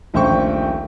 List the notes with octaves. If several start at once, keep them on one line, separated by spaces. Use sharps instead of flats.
D#1 A#1 A3 C5 G5 C#6